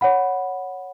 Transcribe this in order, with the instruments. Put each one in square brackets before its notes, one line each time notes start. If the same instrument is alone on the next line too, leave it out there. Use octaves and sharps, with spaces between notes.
[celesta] C#5 F#5 B5